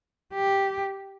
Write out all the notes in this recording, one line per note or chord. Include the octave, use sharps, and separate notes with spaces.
G4